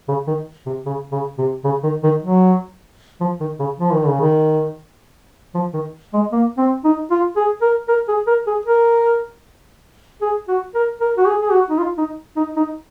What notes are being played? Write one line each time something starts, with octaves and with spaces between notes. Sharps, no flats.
C#3
D#3
C3
C#3
C#3
C3
C#3
D#3
D#3
F#3
F3
D#3
C#3
F3
D#3
C#3
D#3
F3
D#3
G#3
A#3
C4
D#4
F4
G#4
A#4
A#4
G#4
A#4
G#4
A#4
G#4
F#4
A#4
A#4
F#4
G#4
G#4
F#4
D#4
F4
D#4
D#4
D#4